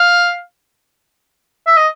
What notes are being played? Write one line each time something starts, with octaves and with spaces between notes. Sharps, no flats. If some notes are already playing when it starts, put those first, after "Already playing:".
Already playing: F5
E5
D#5